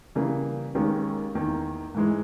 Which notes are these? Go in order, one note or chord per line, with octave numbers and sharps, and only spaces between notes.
C#3 E3 G3 A#3
D#2 D#3 G#3 C#4 G4
E2 D#3 A#3
G#2 E3 G#3